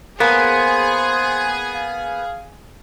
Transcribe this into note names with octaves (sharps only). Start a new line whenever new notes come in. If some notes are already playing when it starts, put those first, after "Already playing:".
A#3 B3 G#4 C5 G#5
F5